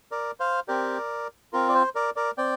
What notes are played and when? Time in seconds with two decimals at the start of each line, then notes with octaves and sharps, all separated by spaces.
0.12 A#4 D5
0.40 C5 F5
0.68 C4 G4 A#4 D5
1.53 C4 F4 A#4
1.69 D5
1.74 C5
1.95 A#4 D5
2.16 A#4 D5
2.38 C4 D5 G5